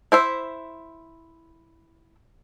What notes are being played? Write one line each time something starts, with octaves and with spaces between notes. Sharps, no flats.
E4 C5 E5